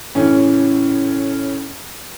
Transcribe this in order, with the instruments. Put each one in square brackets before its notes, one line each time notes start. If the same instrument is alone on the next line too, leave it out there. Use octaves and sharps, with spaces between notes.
[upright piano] A2 C#3 E3 C#4